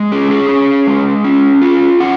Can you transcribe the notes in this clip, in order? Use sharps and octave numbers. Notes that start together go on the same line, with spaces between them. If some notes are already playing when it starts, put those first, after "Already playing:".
Already playing: G#3
C#4 G#4
G#4
C#4
G#3
C#4
F4
C#4 F#5